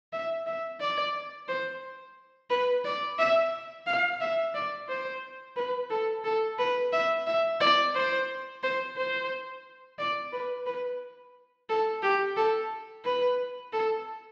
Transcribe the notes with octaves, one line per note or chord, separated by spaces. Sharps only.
E5
E5
D5
C5
B4
D5
E5
F5
E5
D5
C5
B4
A4
A4
B4
E5
E5
D5
C5
C5
C5
D5
B4
B4
A4
G4
A4
B4
A4